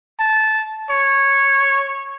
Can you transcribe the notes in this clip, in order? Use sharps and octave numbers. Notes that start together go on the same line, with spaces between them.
A5
C#5